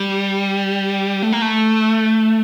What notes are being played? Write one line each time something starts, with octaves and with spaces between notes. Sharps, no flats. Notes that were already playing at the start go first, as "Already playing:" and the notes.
Already playing: G3
A3
A#3
A3